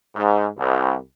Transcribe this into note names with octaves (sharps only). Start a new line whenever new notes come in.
G#2
C2